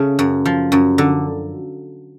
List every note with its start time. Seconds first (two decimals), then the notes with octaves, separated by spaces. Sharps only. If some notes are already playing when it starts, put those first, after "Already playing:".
Already playing: C#3 A3
0.19 F#2
0.46 F3
0.72 F#2
0.98 D3